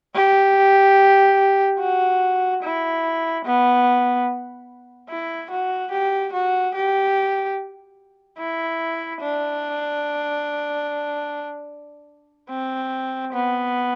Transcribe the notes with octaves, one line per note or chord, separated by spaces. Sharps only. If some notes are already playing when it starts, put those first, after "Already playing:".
G4
F#4
E4
B3
E4
F#4
G4
F#4
G4
E4
D4
C4
B3